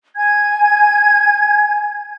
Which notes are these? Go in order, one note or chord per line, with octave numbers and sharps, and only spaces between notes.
G#5 G#6